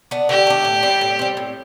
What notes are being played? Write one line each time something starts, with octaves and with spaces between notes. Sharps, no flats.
B3 D4
D3 G4
A3 D4
A2
G3 C4
A2
G3 C4
A2